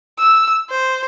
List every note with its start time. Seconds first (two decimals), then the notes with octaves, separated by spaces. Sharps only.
0.19 E6
0.70 C5